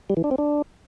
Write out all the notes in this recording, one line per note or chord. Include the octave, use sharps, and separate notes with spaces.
G3
E3
D4
C4
D4